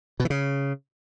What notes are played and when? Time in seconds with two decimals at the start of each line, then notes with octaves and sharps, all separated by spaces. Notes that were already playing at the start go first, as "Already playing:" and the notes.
0.20 B2
0.25 E3
0.30 C#3